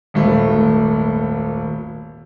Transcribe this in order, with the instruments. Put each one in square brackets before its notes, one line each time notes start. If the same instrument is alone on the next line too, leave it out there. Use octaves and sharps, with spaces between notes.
[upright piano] D#1 G#1 A3